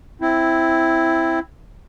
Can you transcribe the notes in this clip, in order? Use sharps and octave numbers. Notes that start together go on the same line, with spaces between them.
C4 E4